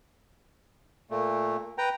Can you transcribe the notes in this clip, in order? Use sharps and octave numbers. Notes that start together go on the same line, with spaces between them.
A#2 A3
B4 G5 A#5